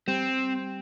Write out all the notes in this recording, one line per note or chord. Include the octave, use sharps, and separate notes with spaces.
G3 C4